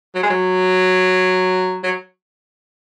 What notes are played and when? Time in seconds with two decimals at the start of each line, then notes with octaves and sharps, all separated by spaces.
0.15 F#3
0.23 G#3
0.30 F#3
1.84 F#3